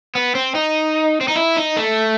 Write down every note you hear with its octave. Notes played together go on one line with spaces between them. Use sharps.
B3
C4
D#4
C4
D#4
E4
D#4
A3